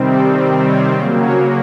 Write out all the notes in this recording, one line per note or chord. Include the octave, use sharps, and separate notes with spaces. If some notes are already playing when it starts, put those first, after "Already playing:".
Already playing: C3 D#3 G3 C4
A4
C#5
C#3 F#3 A#3 C5
C#5